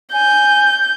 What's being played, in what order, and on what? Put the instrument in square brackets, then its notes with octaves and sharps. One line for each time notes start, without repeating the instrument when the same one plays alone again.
[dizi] G#5 [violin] G6